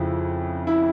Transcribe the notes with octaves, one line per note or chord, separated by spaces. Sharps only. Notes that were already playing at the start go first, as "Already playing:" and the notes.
Already playing: F2 C#3 F3 E4
E4